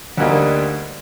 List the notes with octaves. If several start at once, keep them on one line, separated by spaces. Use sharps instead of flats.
D2 D3 G3 A#3 D#4